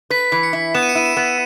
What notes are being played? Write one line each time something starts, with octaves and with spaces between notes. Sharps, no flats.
B4 B6
E3
C#7
E4
B3 E7
D#7
C#7
E4 D#7
E7
B3